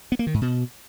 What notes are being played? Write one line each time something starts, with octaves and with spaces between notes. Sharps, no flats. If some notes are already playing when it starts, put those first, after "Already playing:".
B3
A#3
D#3
G#2
B2